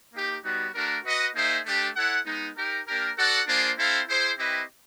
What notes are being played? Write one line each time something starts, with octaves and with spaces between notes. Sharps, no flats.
A#3 D#4 G4
G3 B3 D#4 F#4
A3 D4 F#4 A#4
F#4 B4 D#5 F#5
A#3 D#4 G#4 C5 E5
A3 D4 G4
E4 A4 C#5 F#5
G#3 B3 D#4
D#4 G4 A#4
A#3 D4 G4 A#4
F#4 A4 D5 F#5
A#3 D4 F4 G#4 C5
C4 E4 A4 C5 F5
E4 G#4 C5
C4 E4 G4 B4 D#5